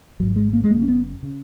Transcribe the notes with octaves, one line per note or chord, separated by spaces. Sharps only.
G#1 G#2 F#3
G#3
A#3
G#3
F#1 F#2 C#3 A#3
C#4
B3
C#3